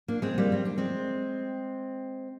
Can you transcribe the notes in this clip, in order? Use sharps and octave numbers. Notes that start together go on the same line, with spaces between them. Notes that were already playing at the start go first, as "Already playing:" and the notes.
A#3 D4
G#3 C4
G3 A#3
C4
D4
G#3 C4